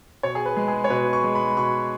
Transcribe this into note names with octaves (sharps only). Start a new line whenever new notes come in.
B2 C#5
G#4
B4
G#3
G#4
C#5
B2 B4
C#6
G#3
B5
B2 C#6